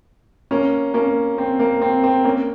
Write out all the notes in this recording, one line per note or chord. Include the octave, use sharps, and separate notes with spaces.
A#3 C#4
A#3 C#4
C4
A#3
C4
C4
A#3 C#4